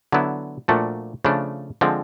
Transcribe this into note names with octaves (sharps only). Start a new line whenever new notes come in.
D3 F#3 B3 E4
A#2 F3 A3 D4 F#4
C#3 F3 A3 D4
D3 F3 G#3 C4